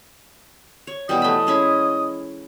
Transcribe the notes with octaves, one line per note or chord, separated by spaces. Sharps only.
C#5
B2 E3 G3 D#5
A3 B5
G#3 C#4 E4